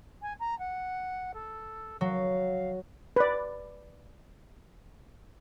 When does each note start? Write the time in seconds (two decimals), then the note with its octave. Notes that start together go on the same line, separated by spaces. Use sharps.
0.22 G#5
0.39 A#5
0.58 F#5
1.34 A4
2.01 F#3 F5
3.16 B4 D5